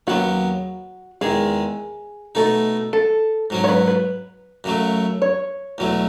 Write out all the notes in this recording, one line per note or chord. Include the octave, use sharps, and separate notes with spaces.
D#2 C#3 F#3 B3 F#4
E2 D#3 G#3 G#4
B2 A3 D#4 A4
A4
G#2 F#3 C#4
C#5
B4
B4
F#2 C#3 F#3 A3
C#5
E2 B2 F#3 A3